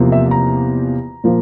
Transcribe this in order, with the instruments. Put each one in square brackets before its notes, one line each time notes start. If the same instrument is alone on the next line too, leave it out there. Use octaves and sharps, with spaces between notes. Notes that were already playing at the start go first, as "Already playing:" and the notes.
Already playing: [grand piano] E2 C3 F3 A#3
E5
A#5
A#2 F3 A#3